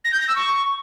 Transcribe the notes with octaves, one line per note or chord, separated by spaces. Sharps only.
A#6
G6
A#6
E6
C#6